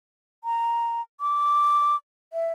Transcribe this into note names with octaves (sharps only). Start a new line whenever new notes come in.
A#5
D6
E5